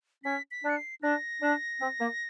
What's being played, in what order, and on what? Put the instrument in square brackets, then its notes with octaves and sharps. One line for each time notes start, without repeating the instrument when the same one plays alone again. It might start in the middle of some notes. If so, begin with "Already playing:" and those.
[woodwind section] C#4 [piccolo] B6
[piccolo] B6
[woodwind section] D4
[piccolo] C#7
C7
[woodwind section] D4 [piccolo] A#6
[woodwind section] D4
C4
A#3